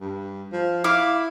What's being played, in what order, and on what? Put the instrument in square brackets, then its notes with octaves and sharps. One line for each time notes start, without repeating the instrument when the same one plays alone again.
[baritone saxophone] G2
F3
[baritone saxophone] E4 [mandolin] F5 D6